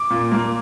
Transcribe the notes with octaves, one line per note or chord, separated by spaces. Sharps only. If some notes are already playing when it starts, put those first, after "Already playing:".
Already playing: D6
A#2
A#3